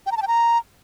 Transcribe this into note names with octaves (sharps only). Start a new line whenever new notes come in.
G5
A#5
A5
G5
A#5